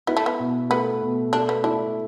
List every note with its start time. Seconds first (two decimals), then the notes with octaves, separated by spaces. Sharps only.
0.07 B3 E4
0.17 A3
0.26 B3
0.40 B2
0.70 A3 B3
1.02 B2
1.33 A3 D4
1.49 B3
1.64 D4 E4